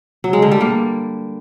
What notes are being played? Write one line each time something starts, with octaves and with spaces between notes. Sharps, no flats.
F#3
G#3
D3
G3
A#3